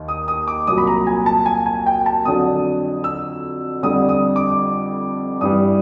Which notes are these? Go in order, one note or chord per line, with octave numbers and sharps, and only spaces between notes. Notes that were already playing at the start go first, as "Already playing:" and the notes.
Already playing: D#2 D#3
D#6
D#6
D6
C2 A#2 F#3 D#6
B5
A#5
G#5
A5
G#5
G#5
G5
A5
F2 D3 F#3 D#6
E6
F2 D3 G3 D#6
D#6
D6
G2 E3 G3 D#6